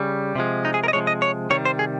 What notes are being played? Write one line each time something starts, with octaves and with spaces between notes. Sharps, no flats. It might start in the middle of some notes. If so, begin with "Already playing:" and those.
Already playing: C#3 G3
C3 F3 G#3
D#4
G#4
A#4
D#5
C3 F3 G#3 C#5
D#5
C#5
C3 D#3 G3 C#5
C5
G#4